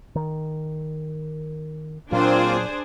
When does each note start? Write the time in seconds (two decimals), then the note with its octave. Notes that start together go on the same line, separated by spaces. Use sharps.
0.15 D#3
2.12 A#2 F#3 A#3 C4 D4 F4 G#4 C5